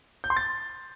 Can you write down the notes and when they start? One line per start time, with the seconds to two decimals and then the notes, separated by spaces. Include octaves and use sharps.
0.24 G6
0.30 C6
0.37 A6